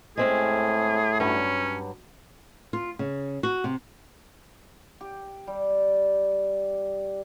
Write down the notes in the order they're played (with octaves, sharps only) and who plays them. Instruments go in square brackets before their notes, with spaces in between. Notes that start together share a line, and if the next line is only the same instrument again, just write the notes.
[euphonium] A2 [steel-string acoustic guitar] G#3 C4 C#4 [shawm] G#4
[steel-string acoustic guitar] G2 F#3 [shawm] C#4
[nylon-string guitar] F4
C#3
F#4
C3
[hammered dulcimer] G4
G3